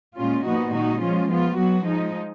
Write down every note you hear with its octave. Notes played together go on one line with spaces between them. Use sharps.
A#2 G#3 C#4 F4
A#2 F3 B3 D#4 F#4
D#3 G#3 D#4 F#4
F3 G#3 C#4 F4
F3 B3 F4
F#3 B3 F#4
F3 G#3 D#4